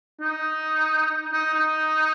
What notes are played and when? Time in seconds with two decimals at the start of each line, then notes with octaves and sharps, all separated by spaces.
0.20 D#4
1.32 D#4
1.54 D#4